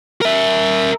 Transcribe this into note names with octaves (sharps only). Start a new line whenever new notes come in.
A#4 E5